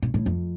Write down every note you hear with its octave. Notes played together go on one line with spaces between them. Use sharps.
A#2
A2
F2